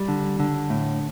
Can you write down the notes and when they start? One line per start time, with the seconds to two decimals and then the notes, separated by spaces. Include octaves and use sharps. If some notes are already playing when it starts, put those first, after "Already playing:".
Already playing: G3
0.08 D3
0.39 D3
0.70 A2